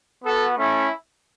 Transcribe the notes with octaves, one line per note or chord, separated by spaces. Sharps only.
B3 F#4 A4
A3 C#4 E4